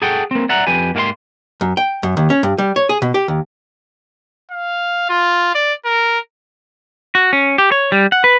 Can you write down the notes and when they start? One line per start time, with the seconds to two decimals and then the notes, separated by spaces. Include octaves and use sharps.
0.02 G#4 A4 F#5 G5
0.31 A#3 C4
0.49 D5 E5 F#5 A#5
0.67 F2 G4 B4 G#5
0.95 G#2 A#3 G4 A#4 F5 C6
1.61 F#2
1.77 G5
2.03 F#2
2.17 D#2
2.30 C#4
2.43 G2
2.58 G3
2.76 C#5
2.89 G#4
3.02 B2
3.14 G4
3.28 D#2
4.51 F5
5.09 F4
5.55 D5
5.85 A#4
7.15 F#4
7.33 C#4
7.58 G4
7.72 C#5
7.92 G3
8.12 F#5
8.24 B4